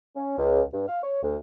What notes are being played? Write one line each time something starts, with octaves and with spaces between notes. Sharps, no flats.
C#4
C#2
G2
F5
C#5
D2